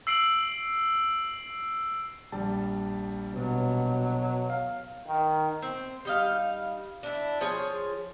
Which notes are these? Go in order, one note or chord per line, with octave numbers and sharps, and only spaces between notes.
E6 C7 D7 F#7
A#1 G3 A5
B2 F#3
F5
D#3
C4
G3 D#4 F5
D4 E4
F3 G#4 C#5 G#5